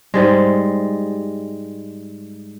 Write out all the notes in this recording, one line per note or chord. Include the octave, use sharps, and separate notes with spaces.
G#2 G3 G#3